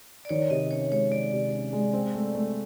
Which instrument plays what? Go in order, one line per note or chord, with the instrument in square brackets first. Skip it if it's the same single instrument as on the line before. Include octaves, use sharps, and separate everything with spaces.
[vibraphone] D5
[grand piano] D#3 [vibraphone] C#5
[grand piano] C3 [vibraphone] D#5
[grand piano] C#4 [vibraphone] C#5
[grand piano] G#3 [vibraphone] C#5
[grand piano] D#3 [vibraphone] D5
[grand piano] C3
C#4
G#3
C4
A3
A3